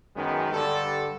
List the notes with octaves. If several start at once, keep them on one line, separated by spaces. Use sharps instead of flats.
F#2 D#3 G#3 B3
G2 D3 G3 A4